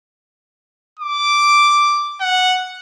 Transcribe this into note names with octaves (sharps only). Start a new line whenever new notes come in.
D6
F#5